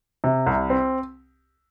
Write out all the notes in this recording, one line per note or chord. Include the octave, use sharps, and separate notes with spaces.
C3
C2
C4